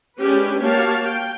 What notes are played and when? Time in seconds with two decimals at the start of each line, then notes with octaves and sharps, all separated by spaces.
0.19 G#3 C#4 D4 G4 B4
0.59 A#3 F#4 G4 C#5 F5 A5
1.04 G5